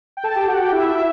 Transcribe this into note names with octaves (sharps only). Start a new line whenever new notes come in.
G5
A4 A5
G4 G5
F#4 F#5
G4 G5
E4 E5
E4 E5